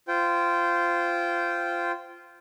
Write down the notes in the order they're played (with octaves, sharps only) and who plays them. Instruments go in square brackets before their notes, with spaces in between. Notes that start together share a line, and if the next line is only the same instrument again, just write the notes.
[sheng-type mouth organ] F4 C5 G5